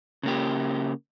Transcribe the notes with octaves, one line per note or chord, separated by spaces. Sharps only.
C#3 A#3 G4